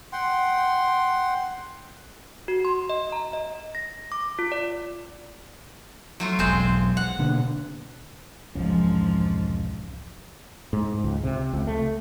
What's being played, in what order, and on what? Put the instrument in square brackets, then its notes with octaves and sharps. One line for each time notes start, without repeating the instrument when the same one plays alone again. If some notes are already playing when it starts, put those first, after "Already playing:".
[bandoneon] F#5 G5 C6
[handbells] F#4
C6
D#5
A#5
D#5
A#6
D6
F4
D5
[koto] F#3 A3 F4
[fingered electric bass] E1 B1 [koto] G#3 C4 C5
[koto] F#5
[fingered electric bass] B2 D3 A#3
[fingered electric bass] E1 C2 C#4 [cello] G#2 F3
[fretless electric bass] G#2
C#2
C3
C#2
A3